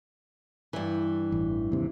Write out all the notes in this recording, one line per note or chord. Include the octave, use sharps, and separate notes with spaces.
G2 E3
A1
D#2 C3